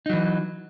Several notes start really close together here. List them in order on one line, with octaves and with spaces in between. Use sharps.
D#4 F#3 E3